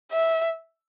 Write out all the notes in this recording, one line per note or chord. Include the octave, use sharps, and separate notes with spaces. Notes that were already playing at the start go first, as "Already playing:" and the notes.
E5